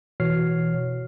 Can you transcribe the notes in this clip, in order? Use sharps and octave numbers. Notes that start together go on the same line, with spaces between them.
B2 E3 F#4 C#5 F6 C7